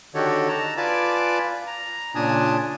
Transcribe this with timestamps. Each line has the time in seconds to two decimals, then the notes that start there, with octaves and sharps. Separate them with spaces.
0.15 D3 D#3 F#4 G4 A4 C#5
0.48 A5 A#5
0.77 F4 B4 D5 G#5 A5 D6
1.67 A#5
2.15 A#2 C#3 D4 G#5 A5 D#6